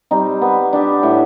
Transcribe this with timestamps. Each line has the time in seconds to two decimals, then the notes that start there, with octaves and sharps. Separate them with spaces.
0.11 G3 C4 D#4
0.41 B3
0.73 D4 G4
1.03 A2